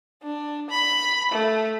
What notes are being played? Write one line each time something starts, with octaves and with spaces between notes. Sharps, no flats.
D4
B5
A3